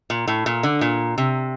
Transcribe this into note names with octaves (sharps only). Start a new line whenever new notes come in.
A#2
A2
A#2
D3
A#2
C3